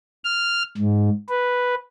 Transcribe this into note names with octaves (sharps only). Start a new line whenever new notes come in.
F6
G#2
B4